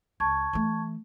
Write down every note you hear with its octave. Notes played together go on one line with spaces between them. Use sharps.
C#2 A5 C#6 G#6
E3 A3